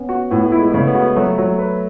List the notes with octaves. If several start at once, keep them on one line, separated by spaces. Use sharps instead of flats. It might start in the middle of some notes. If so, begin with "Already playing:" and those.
Already playing: B3 C#4
F#4
A2 B3
A3
E4
G#3
C#3 A3
B3
F#4
B3
F#3 A3
F#3
B4